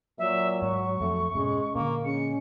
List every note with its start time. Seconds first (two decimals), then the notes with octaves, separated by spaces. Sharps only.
0.18 A#2 F#3 E5
0.62 G#2 C#6
1.01 F2 A3
1.35 G#2 B2 G#3 C#4
1.75 A#2 D3 A#3
2.04 G#3 C#4 C#7